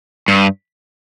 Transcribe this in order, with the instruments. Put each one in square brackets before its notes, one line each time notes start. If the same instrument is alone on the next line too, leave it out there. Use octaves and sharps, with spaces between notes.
[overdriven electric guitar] G2